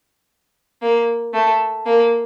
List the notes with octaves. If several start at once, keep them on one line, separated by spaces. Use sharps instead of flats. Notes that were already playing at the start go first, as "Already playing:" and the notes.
A#3
A3
A#3